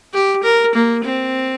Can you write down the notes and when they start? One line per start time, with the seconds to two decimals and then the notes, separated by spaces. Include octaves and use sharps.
0.13 G4
0.43 A#4
0.75 A#3
1.05 C4